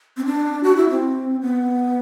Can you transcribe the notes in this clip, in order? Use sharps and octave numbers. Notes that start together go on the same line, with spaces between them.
C4
D4
F#4
E4
C4
B3